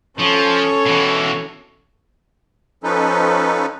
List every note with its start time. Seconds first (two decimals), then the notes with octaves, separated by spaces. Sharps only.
0.19 F3 C#4 A4 C#5
0.86 B2 E3
2.84 F3 C#4 D#4 A4 B4